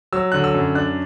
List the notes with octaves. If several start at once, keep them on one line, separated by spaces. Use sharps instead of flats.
F#3 E6
D3 F#6
E6
F#2
D4 F#6